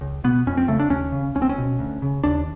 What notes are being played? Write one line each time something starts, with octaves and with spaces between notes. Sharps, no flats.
C#2
B2 B3
F2 C#4
C4
C#3 A3
D4
D#2 C#4
C#3
C#2 C#4
C4
C#4
B2
D2
C#3
D#2 D4